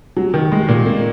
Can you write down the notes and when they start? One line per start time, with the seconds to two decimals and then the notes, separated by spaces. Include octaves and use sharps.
0.17 F#3
0.34 D#3
0.52 G#3
0.68 A#2
0.86 A#3